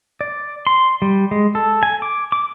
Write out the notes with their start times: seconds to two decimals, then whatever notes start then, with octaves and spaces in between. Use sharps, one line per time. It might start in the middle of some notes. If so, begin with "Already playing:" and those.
0.21 D5
0.67 C6
1.02 G3
1.31 G#3
1.55 A4
1.83 G#5
2.02 D6
2.32 D6